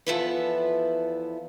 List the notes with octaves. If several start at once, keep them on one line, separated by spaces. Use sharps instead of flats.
E2 F3 B3 E4 A4 B4